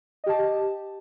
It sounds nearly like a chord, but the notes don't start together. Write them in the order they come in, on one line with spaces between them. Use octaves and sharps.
D#5 G4 A5